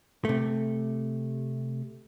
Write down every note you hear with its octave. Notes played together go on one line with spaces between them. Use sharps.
C3 A3